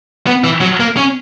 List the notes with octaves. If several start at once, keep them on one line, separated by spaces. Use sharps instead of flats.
B3
E3
F#3
A#3
C#4